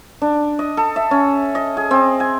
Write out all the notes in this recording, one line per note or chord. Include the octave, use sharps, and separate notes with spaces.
D4
D#5
A4
E5
C#4
D#5
G#4
C4
G#5